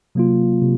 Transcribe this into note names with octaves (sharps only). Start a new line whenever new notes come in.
C3 F#3 A#3 F4
C3